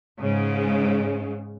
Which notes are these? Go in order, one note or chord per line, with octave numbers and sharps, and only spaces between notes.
G#2 C#3 G#3